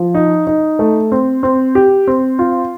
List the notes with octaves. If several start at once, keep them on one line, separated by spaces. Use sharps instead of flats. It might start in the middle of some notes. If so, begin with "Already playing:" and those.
Already playing: F3
D#4
D#4
A3
C4
C4
G4
C4
F4